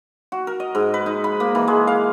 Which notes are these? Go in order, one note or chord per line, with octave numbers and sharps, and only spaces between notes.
F#4
A#4
D#5
G#2
B4
D#4
B5
A#3
E3
G#3
F5